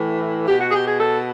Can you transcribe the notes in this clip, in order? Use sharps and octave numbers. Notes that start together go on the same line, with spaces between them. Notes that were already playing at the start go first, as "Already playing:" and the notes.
Already playing: A2 E3
B2 G4
F#4
G#4
G4
G#4
A4